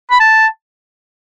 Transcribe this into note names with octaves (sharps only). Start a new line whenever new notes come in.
B5
A5